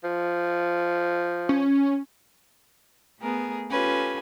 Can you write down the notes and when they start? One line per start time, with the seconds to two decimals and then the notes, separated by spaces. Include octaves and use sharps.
0.04 F3
1.49 C#4
3.21 A3 B3 G#4 A#4
3.71 C#4 F4 G4 A4 B4 G#5